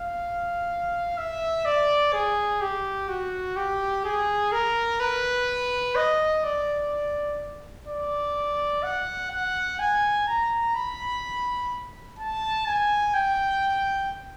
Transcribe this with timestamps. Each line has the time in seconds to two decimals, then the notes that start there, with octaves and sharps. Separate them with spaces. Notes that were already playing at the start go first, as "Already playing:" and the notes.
Already playing: F5
1.18 E5
1.65 D5
2.13 G#4
2.61 G4
3.08 F#4
3.56 G4
4.04 G#4
4.52 A#4
5.00 B4
5.96 D#5
6.44 D5
7.87 D5
8.83 F#5
9.31 F#5
9.79 G#5
10.27 A#5
10.75 B5
12.19 A5
12.66 G#5
13.14 G5